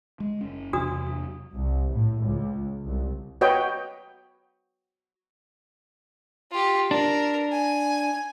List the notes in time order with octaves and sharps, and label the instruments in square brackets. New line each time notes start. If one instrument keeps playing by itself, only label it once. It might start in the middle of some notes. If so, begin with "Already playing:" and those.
[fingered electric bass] G#3
F#1 C#4
[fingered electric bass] E2 C3 F#3 [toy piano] D4 F#4 D#6
[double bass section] C2
A2
C#2
C2
[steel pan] F#4 B4 C#5 D#5 G5
[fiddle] F4 G4
[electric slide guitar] D4 [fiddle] A#4
[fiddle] G#5